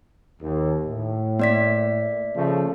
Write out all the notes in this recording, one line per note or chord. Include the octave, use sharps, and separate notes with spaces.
D#2
A2
A#3 D5 B6
C#3 F3 A3